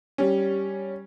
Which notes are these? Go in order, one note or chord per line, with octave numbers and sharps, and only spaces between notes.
G3 C#4